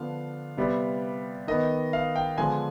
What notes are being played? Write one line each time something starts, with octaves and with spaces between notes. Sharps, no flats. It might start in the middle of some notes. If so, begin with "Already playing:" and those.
Already playing: D3 F3 B3 F5
C3 G3 B3
D#3 B3 D#5
F5
G5
D3 F3 G#3 B3 G#5